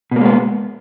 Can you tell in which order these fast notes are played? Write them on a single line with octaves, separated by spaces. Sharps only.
B2 A#3 G#3 B3